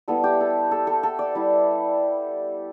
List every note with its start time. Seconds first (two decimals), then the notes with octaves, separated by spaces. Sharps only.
0.08 G3 B3 E4 A4
0.24 G4
0.41 A4
0.71 A4
0.87 A4
1.03 A4
1.19 D5
1.35 G3 E4